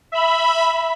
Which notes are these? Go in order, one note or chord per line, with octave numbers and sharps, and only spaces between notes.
E5 B5